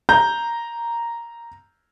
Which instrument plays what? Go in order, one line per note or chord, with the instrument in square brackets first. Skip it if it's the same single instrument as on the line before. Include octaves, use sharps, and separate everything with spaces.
[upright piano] A#5 G6